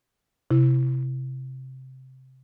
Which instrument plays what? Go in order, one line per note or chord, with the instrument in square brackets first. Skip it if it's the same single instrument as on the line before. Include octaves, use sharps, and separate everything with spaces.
[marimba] C3 E4